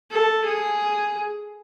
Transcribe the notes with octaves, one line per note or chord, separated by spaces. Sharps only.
A4
G#4